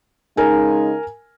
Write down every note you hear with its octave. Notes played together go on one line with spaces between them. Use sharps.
C#3 G#3 D#4 A#4 G#5